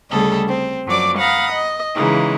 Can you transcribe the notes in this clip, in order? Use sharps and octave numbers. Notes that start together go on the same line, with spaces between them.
D2 C#3 G3 G#4 A4 D#5
C4
F#2 F3 F#3 D5 D6
F5 F#5 A#5 B5 D#6
D#5
C#3 E3 G#3 A#3 D#4